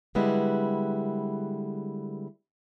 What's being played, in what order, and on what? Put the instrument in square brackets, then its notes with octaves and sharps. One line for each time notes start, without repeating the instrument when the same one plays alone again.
[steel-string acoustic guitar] D3 G3 G#3 B3 E4 B4